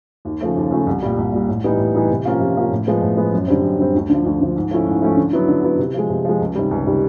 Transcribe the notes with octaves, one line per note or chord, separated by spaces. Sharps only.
D#2
C#3 F3 A3
D#2
C#3 F3 A3
C2
A#2 G3
C2
A#2 G3
A2
E3 G3 B3 D#4
A2
E3 G3 B3 D#4
C3
F3 A#3 C#4 F4
C3
F3 A#3 C#4 F4
A2
F3 G#3 B3
A2
F3 G#3 B3
F#2
D3 G3 C4
F#2
D3 G3 C4
D2
D3 F3
D2
D3 F3
G#2
F3 A3 C#4 E4
G#2
F3 A3 C#4 E4
D3
F#3 B3 E4
D3
F#3 B3 E4
C3
F3 G#3
C3
F3 G#3
C#2
C3 D#3 G3
C#2
C3 D#3 G3